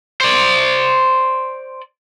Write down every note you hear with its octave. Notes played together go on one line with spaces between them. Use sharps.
C5 D5